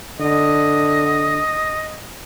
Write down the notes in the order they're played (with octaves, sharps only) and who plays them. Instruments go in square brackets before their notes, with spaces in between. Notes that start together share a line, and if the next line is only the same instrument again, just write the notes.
[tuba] D3 [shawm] D#5